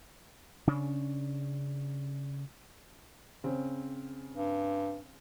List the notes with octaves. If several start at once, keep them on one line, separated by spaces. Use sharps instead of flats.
C#3 C#4 D4
C#3 C4
G2